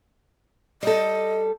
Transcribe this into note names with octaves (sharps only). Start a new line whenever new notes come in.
G3 A4 D#5